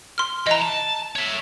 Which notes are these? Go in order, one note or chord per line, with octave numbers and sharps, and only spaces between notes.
C6 F6
E3 D#5 A#5
A5
C#5 E5